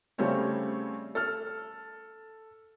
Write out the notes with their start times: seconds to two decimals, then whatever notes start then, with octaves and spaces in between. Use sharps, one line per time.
0.18 C#3 G3 A3 C4 C#4 C#5
1.15 A4 F6